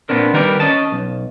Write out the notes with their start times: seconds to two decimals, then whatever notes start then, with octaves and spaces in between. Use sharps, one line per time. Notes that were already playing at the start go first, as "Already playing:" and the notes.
0.09 A#2 B3 C4 D4 A#4
0.33 D#3 G3 A#4 B4 D5
0.60 C#4 D#5 A5
0.92 B1